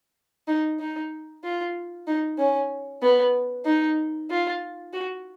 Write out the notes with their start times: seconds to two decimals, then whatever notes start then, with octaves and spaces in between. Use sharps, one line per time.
0.48 D#4
0.79 D#4
1.44 F4
2.07 D#4
2.38 C#4
3.03 B3
3.66 D#4
4.30 F4
4.93 F#4